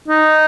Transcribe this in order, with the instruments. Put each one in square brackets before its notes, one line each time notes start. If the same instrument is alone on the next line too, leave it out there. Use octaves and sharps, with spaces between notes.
[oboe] D#4